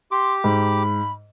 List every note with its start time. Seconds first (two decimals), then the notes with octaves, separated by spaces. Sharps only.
0.11 G4 C6 D6
0.44 G#2 B5